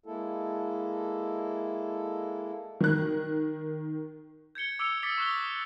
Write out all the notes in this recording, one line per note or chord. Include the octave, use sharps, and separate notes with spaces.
G#3 A#3 E4 A4
D#3 F#6
G6 G#6 C#7 G7
D6 E6 C#7 D7 F7
D6 D#6 A6 B6 C#7 G7
C#6 F#6 G7